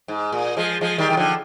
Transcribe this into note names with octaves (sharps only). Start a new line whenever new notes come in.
G#2
A#2
F3 G#3
F3 G#3
D#3 G3
D#3
D3 F3